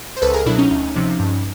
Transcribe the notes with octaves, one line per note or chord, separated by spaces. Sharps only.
C5
C#2 A4 B4
G#4 A#4
B2 F#3 D4 E4
C#4 D#4
D2
C3 F3
G2